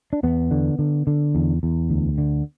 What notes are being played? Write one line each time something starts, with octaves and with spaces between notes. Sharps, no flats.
D4
E2 B3
D3
D3
D3
E2
E2
D2
D3